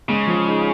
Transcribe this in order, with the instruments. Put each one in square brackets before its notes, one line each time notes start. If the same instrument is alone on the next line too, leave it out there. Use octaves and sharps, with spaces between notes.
[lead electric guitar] C#3 [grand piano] G#3
[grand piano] F3
D#4